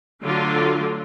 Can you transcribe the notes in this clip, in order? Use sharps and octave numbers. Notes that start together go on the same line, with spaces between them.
D3 F#3 A3 D4 F4